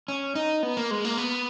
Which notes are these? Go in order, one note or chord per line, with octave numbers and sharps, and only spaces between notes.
C#4
D#4
B3
A#3
G#3
A#3
B3